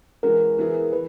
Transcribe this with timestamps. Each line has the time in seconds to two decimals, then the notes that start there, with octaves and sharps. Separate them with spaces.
0.23 E3 G#3 C#4 F#4 A#4
0.59 E3 B3 E4 G#4
0.93 E3 B4